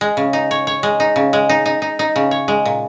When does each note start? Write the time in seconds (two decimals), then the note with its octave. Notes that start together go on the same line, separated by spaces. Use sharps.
0.01 G#3
0.17 C#3
0.33 D#4
0.51 C#5
0.67 C#5
0.83 G#3
1.00 D#4
1.16 C#3
1.33 G#3
1.49 D#4
1.66 D#4
1.82 D#4
1.99 D#4
2.16 C#3
2.31 C#5
2.48 G#3
2.65 A#2